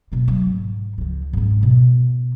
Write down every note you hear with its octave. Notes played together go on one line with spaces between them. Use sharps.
B2 A#3
F#3 A3
G#2
C#2 F3
G#2 C#4
B2